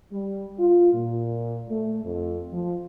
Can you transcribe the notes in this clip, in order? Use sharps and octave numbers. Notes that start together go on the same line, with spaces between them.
G3
F4
A#2
A3
F2
F3